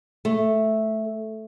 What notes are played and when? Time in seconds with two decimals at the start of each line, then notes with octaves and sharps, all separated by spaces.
0.25 A3